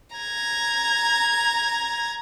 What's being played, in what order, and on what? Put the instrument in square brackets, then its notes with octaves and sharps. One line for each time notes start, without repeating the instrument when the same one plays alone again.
[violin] A#5 G#6